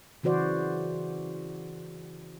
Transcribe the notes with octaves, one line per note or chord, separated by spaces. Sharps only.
C#3 E3 F#4 C5 D5